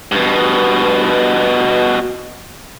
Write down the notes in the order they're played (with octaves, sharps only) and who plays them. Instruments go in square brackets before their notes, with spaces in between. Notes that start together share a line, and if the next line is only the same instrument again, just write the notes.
[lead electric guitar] G2 B2